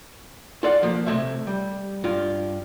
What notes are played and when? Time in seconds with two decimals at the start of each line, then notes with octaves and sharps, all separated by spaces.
0.63 F4 A4 D5 F5 F#5
0.83 F3 A#3
1.06 C3 A3 C#5 E5
1.47 G3
2.04 G2 F4